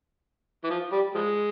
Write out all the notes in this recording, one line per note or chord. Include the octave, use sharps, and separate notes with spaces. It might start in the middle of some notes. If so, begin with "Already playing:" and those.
E3
F3
G3
F3 G#3